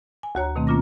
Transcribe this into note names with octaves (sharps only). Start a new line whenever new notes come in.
G#5
D2 F#4 C#5 A#5
B2 D#3 A3 C4
A#3 C#4 F4 D6 A#6